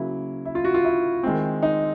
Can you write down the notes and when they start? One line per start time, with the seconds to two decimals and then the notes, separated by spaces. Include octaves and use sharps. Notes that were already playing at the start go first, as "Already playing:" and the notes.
Already playing: C#3 F#3 A#3 E4
0.45 E4
0.55 F4
0.65 F#4
0.74 F4
0.84 E4
1.23 D#3 G#3 C4
1.62 D#4